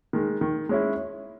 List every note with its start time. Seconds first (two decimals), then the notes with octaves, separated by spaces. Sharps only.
0.13 D#3 G#3
0.41 D#3
0.69 G#3 C#4 E4